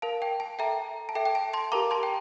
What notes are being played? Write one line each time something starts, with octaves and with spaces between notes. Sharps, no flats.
A#4 F5 A5
G5
A5
A4 E5 G5 A#5
A5
A4 E5 G5
G5
A5
A5 C6
G4 A#4 F5 A#5 D6
A5 C6
G5